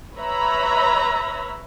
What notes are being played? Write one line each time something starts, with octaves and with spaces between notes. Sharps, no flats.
B4 C#5 E5 A#5 B5